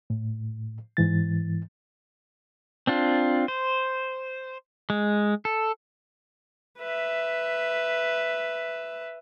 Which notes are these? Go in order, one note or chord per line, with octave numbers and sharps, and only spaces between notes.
A2
G#2 E3 A6
C4 D4 F4
C5
G#3
A4
B4 E5